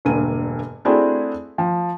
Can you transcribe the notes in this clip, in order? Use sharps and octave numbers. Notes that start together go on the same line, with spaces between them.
E1 G2 D3 A#3 G#5 D#7
A3 C4 D4 E4 F#4 G#4
F3